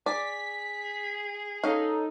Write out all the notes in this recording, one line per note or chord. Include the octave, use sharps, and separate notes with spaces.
G#4 D5 B6
C#4 D#4 A4 F5